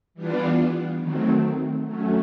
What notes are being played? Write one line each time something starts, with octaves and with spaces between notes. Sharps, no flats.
E3 G3 B3 D4 F4
D#3 F#3 A3 C4
F#3 A3 C#4